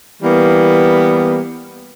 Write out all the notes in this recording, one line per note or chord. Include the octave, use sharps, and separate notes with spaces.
E3 G3 A#3 B3